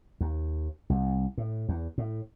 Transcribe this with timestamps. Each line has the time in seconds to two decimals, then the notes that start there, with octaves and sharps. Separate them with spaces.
0.21 D#2
0.90 C2
1.38 A2
1.69 E2
1.98 A2